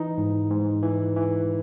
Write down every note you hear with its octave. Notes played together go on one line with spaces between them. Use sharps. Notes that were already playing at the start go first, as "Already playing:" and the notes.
Already playing: E3 D#4
G#2
G#2
E3
E3